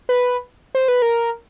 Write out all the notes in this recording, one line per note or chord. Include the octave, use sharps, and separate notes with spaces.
B4
C5
B4
A#4